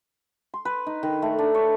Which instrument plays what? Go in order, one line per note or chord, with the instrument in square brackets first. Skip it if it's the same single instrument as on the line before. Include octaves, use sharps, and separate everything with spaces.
[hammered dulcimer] C6
B4
D#4
D#3
A3
D4
C#5